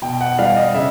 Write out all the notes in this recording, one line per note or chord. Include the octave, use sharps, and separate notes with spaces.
B2 G5
F#5
G3 F5
D#5
C#3 E5